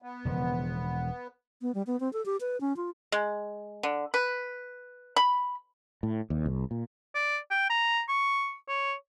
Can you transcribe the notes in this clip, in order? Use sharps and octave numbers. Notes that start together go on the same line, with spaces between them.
B3
E1 C#3 F3
B3
G3
B3
C4
A4
G4
B4
C#4
F4
G#3
D3
B4
B5
A2
D#2
C2
A#2
D5
G5
A#5
C#6
C#5